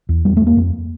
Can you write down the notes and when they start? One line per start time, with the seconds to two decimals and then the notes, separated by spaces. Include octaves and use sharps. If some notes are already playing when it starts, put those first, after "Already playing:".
0.09 E2
0.25 E2 G3
0.37 E2 A3
0.47 A#3
0.57 F2